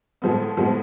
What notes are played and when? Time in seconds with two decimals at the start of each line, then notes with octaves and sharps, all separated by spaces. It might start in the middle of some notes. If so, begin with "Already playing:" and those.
0.22 A2 F3 G#3 B3
0.57 A2 F3 G#3 B3